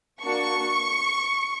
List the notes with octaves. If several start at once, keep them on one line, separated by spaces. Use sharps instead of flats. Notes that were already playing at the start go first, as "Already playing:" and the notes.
A#3 D4 F#4 C#6